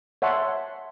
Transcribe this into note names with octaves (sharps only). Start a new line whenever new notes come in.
C#5 E5 F#5 A5 C6